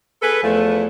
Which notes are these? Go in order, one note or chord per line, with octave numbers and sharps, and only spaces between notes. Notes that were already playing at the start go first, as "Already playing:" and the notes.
G#4 A4 B4
E2 F3 A3